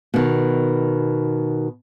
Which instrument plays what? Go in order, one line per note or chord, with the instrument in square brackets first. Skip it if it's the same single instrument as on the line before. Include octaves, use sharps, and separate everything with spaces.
[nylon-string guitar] B2 D#3